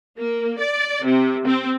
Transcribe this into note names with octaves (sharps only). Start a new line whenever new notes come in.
A#3
D5
C3
C4